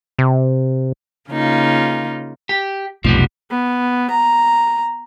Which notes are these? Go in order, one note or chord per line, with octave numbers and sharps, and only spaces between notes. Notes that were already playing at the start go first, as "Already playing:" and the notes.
C3
C#3 A#3 D#4 F4
G4
F1 B1 F2 F3 G3 B3
B3
A#5